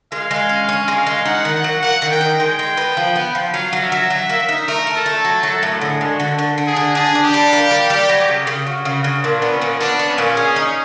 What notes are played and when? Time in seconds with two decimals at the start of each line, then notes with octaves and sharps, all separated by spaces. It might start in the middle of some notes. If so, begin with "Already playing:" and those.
0.12 G#3 F5
0.31 G#3
0.49 C#4
0.69 C#4 F5
0.88 G#3
0.97 F5
1.07 G#3
1.25 D#4 F#5
1.45 D#3
1.55 F#5
1.64 F#3
1.83 A#3 F#5
2.02 D#3
2.11 G5
2.21 D#4
2.40 G#3 G5
2.59 G#3
2.77 B3
2.97 F3
3.15 B3
3.35 F3
3.53 F#3 F5
3.73 F#3
3.82 E5
3.92 F#3
4.10 F#3
4.29 A#3
4.49 D#4
4.67 A3 A#4
4.87 A3
4.96 A4
5.06 A3
5.25 F#3
5.43 F#3
5.63 A2
5.81 D3 G#4
6.01 G#3
6.10 F#4
6.20 D3
6.38 D3
6.58 D3
6.67 G#4
6.76 D3
6.95 D4 G#4
7.15 D4
7.24 G4
7.34 G3
7.53 A#3
7.71 G3
7.90 G3
8.09 F#3
8.28 C#3
8.47 C#3
8.66 C#3 F#4
8.85 C#3
9.04 C#3
9.23 A#2 D4
9.42 B3
9.52 C#4
9.61 A#2
9.80 B3 D4
9.99 B3
10.09 C#4
10.18 A#2
10.37 G#4
10.56 D#4